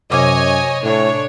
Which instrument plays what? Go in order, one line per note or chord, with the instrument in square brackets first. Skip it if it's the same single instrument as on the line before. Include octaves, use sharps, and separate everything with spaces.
[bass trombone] F#2 [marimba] C3 D6 [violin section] C#5 D#5 G#5
[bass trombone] A2 [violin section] D4 C#5